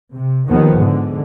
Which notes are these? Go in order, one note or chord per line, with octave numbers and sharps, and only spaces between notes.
C3
D#2 D#3 F3 B3
G#2 D3